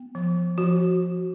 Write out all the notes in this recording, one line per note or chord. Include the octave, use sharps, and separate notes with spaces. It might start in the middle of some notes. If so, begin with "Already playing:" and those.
Already playing: B3
F3
F3 F#4